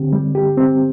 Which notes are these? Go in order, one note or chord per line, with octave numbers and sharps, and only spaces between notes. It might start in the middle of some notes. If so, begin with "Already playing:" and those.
Already playing: D3 C4 G4
G3
G4
C4